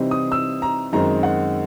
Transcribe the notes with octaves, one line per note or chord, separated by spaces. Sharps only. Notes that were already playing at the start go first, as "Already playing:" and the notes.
Already playing: C3 E3 G3 C4 D#4
D#6
E6
A#5
F#2 D#3 G#3 C4 D#4 A#5
F#5